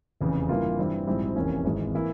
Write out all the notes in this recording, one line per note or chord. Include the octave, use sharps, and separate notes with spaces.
F1 E2 C#3
G2 E3 A#3 F4
G2 E3 G3 C4
A#1 G#2 G3 C4 E4
F1 E2 E3 A#3 C#4
G#1 G#2 E3 G#3
E3 A#3 E4